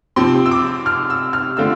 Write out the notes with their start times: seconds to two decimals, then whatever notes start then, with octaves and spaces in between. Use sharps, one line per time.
0.16 C3 F3 C4 C6
0.46 E6
0.51 D6
0.86 F6
1.10 E6
1.33 F6
1.57 D3 A3 C4 F4 E6